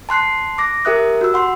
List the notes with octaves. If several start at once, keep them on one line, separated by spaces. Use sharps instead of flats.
A5 C6 F#6 C7
D6 A#6
G4 A#4 E5 D#6 F#6
F#4 E6
F#5 C6